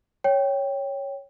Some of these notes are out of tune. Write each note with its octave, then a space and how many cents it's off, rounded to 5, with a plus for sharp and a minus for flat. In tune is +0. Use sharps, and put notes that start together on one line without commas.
C#5 +0 G5 +0